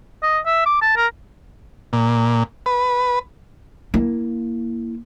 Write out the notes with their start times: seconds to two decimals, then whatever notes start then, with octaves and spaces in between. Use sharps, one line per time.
0.23 D#5
0.46 E5
0.66 D6
0.82 A5
0.97 A#4
1.93 A#2
2.66 B4
3.94 A#3 E4